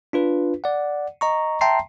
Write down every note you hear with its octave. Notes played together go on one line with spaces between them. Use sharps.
D4 F4 B4
D5 F#5
D#5 A#5 C#6
E5 G5 A5 A#5 C6 C7